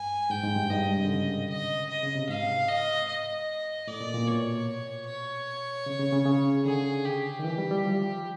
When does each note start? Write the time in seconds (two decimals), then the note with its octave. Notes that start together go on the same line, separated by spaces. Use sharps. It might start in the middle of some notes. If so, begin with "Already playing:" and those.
Already playing: G2 G#5
0.30 G#2 G5
0.44 G#2
0.57 G2
0.70 G2 D#5
0.83 G#2
0.96 C3
1.05 D3
1.09 C#3
1.49 D#5
1.89 D#5
2.03 C#3
2.16 C3
2.29 G#2 F5
2.68 D#5
3.08 D#5
3.87 A2 D5
4.00 A#2
4.14 A#2
4.27 B2 C#5
5.06 C#5
5.86 C#3
5.99 C#3
6.12 C#3
6.25 C#3
6.65 D3 G#4
7.05 G4
7.39 D#3
7.44 E3 G4
7.58 G3
7.71 G3
7.84 F3